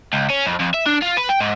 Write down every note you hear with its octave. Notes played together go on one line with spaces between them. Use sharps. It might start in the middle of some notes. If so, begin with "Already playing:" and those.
C#2
C#4
F2
F2
E5
D4
F4
B4
G5
G#2